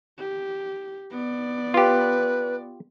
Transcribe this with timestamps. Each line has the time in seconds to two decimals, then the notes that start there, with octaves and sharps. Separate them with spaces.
0.19 G4
1.11 B3 D5
1.74 F4 G4 B4